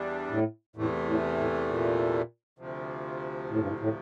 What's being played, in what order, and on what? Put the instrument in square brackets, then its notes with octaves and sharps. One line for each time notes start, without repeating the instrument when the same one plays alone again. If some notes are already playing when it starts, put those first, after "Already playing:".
Already playing: [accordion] E2 E3 G3 D4
[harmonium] A2
[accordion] E2 C3 E3 A3 [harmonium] A2
[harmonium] A2
A2
A#2
[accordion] D2 C3 F3
[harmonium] A2
G2
A2
A2